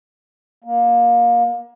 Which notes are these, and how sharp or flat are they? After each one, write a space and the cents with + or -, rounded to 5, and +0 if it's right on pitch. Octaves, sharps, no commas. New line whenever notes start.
A#3 +25